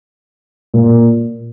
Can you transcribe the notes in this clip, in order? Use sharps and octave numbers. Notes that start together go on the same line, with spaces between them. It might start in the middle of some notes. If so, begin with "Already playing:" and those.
A#2